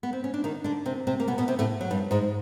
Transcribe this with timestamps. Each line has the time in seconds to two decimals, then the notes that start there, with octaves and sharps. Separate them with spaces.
0.03 B3
0.13 C4
0.24 C#4
0.34 D4
0.44 D#3 D#4
0.64 D3 D4
0.86 C3 C4
1.07 C3 C4
1.20 A#3
1.28 B2 B3
1.38 B2 B3
1.48 C3 C4
1.59 A2 A3
1.81 F#3
1.91 G2 G3
2.11 G#2 G#3